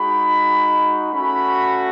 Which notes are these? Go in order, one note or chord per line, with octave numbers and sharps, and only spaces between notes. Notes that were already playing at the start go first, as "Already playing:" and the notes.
Already playing: G#3 D#4 F#4 B5
A3 C#4 F#4 B5